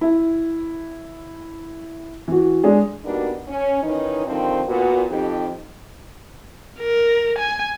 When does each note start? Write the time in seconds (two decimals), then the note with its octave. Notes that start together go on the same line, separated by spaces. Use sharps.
0.01 E4
2.28 E3 F#4
2.64 G#3 D4 G#4
3.05 G3 A#3 B3 D4 D#4 F#4
3.48 C#4
3.83 D#3 E3 C#4 D#4
4.26 D3 D#3 F3 G3 C4
4.68 A#2 B3 F#4
5.10 F2 D#4 G4
6.80 A#4
7.39 G#5